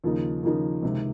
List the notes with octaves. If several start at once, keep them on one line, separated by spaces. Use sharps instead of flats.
D#2 C#3 F3 A#3 D#4
D#2 C#3 F3 A#3 D#4
C#2 C3 D#3